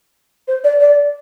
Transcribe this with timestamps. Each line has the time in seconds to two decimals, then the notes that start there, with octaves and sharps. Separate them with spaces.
0.48 C5
0.64 D5
0.80 D5